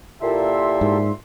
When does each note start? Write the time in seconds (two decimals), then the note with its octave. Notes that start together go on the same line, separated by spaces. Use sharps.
0.22 A#2 E4 G4 A4 E5 C6
0.81 G#2